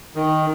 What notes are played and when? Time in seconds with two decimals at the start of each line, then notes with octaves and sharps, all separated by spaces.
0.15 D#3